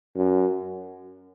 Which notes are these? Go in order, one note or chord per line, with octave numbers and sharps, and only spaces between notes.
F#2